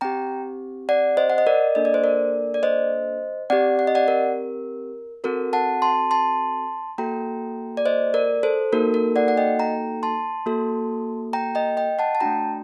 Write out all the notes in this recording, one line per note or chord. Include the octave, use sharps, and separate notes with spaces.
C4 G4 G5 A#5
D5 F#5
C5 D#5
F#5
D#5
A#4 D5
A#3 D4 A4 D#5
D5
C5
A#4 D5
D5
C5 D#5
C4 G4 D5 F#5
F#5
D#5
D5 F#5
A#4
C4 F#4 A4 A#4
F#5 A5
A5 C6
A5 C6
A#3 F#4 A4 G5 A#5
D5
C5 D#5
A#4 D5
A4 C5
A#3 D#4 F#4 A4 A#4
A#4
D5 F#5
F#5
D#5 G5
G5 A#5
A5 C6
A#3 F#4 A4
G5 A#5
D#5 G5
D#5 G5
F#5 A5
A5
A3 D4 F#4 G5 A#5